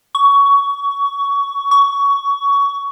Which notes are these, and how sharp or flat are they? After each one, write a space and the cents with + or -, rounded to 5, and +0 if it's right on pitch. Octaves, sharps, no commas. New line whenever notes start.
C#6 +20
C#6 +20